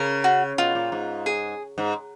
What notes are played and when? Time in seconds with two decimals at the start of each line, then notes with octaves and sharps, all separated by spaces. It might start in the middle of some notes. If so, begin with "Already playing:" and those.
Already playing: C#3 A#4
0.24 F#4
0.58 B2 F4
0.75 A#2
0.92 G#2
1.26 G#4
1.78 G#2